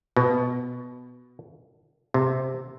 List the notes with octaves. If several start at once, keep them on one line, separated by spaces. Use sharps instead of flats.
B2
C3